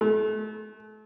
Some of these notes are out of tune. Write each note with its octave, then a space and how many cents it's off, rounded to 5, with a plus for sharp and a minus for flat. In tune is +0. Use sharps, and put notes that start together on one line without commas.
A3 -35